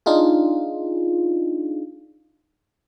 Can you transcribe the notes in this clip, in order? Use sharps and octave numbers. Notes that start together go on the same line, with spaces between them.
D4 D#4 F4 G#4